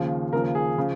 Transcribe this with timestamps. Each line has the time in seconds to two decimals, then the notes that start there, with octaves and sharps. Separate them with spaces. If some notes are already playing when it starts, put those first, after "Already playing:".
Already playing: D#2 C#3 F3
0.33 D#2 C#3 F3 A#4
0.55 G#4
0.78 C#3 F3